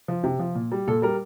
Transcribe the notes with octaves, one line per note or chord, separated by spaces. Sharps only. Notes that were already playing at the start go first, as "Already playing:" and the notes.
F3
C3
F3
A#2
G3
A#2 A4
G3 A#4